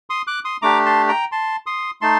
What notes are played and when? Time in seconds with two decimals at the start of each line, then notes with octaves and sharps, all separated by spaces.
0.10 C6 D#6
0.27 D6 F#6
0.44 C6 D#6
0.62 A3 D4 G4 A#5 D6
0.85 A5 C6
1.08 G5 A#5
1.32 A5 C6
1.66 C6 D#6
2.01 A3 D#4 A5 C6